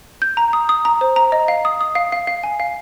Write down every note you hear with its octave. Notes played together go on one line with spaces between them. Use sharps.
G6
A#5
D#6
D#6
A#5
C5
A#5
D#5
F5
D#6
D#6
F5
F5
F5
G#5
F5